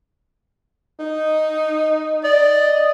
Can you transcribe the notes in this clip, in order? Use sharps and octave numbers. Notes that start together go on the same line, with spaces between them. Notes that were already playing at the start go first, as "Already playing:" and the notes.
D#4
D5 D#5